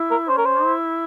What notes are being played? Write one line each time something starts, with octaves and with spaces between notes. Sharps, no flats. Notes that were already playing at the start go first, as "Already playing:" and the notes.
Already playing: E4
A#4
C#4 C5
A#4
C5
E4